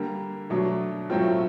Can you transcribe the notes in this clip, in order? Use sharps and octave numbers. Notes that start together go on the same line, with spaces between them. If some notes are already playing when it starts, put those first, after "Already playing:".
Already playing: D3 G3 A#3
B2 F#3 A3 D4
A2 F#3 A3 C4 F4